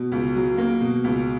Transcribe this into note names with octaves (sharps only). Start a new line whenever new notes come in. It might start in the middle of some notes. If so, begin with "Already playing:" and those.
Already playing: B2
C#2
F#3
A#3
B2
C#2